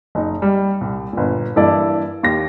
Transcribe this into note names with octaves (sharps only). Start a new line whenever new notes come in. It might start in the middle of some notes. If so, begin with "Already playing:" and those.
F#1 D#4
G3
C2
G1 A#2
G2 E3 A#3 E4 A4 D5
D#2 G4 A#6